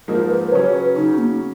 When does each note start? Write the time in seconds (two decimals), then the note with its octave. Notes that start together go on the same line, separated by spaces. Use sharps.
0.08 G#2 F3 A#3 D#4 A#4
0.30 B4
0.52 C#3 F#3 C#4 C#5
0.66 B4
0.96 C#3 F#3 C#4 D#4
1.18 A#3